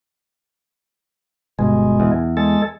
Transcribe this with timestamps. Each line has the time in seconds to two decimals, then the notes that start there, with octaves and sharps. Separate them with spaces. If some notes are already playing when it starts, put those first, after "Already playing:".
1.59 G1 B2 G#3
2.00 E2
2.37 G#3 A4